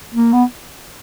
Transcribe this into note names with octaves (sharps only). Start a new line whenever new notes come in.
A#3
B3